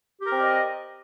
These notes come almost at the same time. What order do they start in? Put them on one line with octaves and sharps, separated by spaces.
G4 A#4 C4 D5 D#5